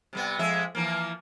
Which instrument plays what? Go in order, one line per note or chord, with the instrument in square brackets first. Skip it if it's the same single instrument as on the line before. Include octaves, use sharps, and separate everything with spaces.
[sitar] C3 G3 B3
F2 G#3 E5
E3 F3 A#3